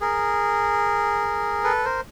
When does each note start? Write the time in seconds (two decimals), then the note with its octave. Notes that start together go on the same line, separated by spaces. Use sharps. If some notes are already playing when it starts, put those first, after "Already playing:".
0.01 G#4 A#4
1.64 A4 B4
1.84 A#4 C5